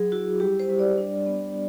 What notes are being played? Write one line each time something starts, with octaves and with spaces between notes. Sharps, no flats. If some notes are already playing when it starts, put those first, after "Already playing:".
Already playing: F#3 G#4
E4 F#4
G3 G4
C5
G3
D5
D4
B3